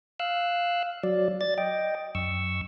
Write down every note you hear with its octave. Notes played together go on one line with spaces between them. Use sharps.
F5 E6 F#6
F#3 D5
D5 A6
D#5 G5
F#2 C#6 E6